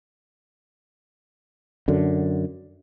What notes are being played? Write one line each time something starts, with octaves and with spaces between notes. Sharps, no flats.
F#2 D3